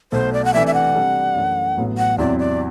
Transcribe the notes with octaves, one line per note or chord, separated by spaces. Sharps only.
B1 B2 A3 C5
D5
F#5
C3 E3 A3 D4 E5
E5
F#5
C3 G3 D4 A4
F#2 E3 A3
A1 A2 F#3 B3
F#5
E2 C3 F#3 C4 E4 D5
D5